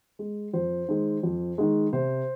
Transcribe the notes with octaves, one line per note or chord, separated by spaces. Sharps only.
G#3
F2 C5
D#3 G#3
F2
D#3 G#3
C3 C5